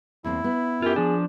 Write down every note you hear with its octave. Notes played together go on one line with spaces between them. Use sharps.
E2 A#3 C4 E4
B3
F#2 F4 G4
F3 D4 G#4